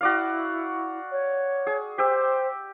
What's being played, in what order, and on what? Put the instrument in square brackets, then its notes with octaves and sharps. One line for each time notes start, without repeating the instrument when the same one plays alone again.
[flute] E4 [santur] F#4 D5 F5
[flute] C#5
[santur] G#4
[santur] G4 E6 [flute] C5